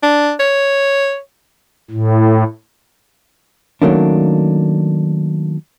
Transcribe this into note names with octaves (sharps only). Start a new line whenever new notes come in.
D4
C#5
A2
D#3 F#3 A3 A#3 C#4 D4